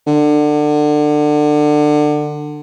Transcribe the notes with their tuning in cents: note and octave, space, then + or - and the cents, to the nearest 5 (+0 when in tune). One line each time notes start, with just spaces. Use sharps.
D3 +25